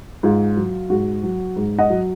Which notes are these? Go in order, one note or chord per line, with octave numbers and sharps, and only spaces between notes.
G#2 F4
F#3
G#2 F#4
F#3
G#2
D#5 F#5
F#3